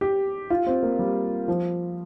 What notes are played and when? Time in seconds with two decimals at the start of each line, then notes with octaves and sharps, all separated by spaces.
0.01 G4
0.50 F4
0.66 C4
0.83 A#3
0.99 G3
1.48 F3